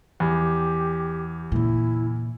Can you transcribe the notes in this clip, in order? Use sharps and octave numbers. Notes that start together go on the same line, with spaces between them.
E2 G4
A#2 C#3 E4